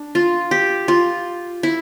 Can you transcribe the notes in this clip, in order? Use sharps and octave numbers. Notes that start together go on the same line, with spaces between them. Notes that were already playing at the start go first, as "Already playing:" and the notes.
Already playing: D4
F4
G4
F4
E4